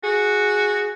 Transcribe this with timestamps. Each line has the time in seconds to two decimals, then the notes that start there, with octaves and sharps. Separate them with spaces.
0.04 F#4 G#4